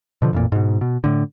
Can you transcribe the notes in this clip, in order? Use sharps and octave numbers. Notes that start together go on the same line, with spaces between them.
B2 D3 F3
A1 F2 A#2
G#2 B2
B2
A2 D3